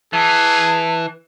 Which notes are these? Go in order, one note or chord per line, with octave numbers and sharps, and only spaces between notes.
E3 G#4 A5